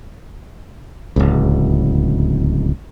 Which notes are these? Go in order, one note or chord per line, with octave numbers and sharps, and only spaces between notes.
D1 G#1 C#2